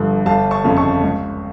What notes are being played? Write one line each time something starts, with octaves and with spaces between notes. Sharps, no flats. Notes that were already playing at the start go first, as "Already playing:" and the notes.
Already playing: G1 G2 D3 F3
G1 F5 A5
A5 C#6
F2 C#3 F3
A5 C#6
C#2